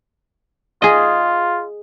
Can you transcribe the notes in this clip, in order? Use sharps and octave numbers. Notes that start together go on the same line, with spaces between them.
F4 G#4 D#5